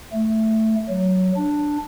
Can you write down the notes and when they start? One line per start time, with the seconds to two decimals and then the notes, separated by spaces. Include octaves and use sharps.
0.13 A3
0.89 F#3
1.37 D4